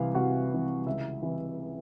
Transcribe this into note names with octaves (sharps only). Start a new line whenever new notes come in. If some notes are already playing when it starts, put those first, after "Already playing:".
Already playing: C2 C3 E3 F5
C2 F#4 F#5
C3 E3
C#2 E4 E5
C3 E3